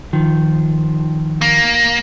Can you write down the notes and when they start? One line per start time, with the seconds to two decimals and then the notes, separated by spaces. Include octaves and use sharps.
0.13 D#3 F3
1.41 A#3